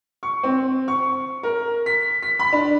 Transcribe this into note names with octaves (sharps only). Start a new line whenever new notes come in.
C#6
C4
C#6
A#4
B6
B6
B5
D4